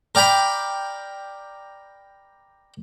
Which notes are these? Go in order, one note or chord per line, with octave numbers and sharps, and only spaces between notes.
A#4 D5 G5 A#5 B5